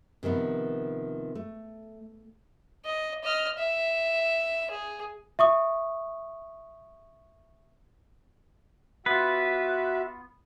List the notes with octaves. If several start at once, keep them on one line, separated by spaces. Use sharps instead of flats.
C3 D#3 F3 B3
A3
D#5
D#5 F6
E5
G#4
E5 C#6 D#6
B3 F4 F#4 B4 E5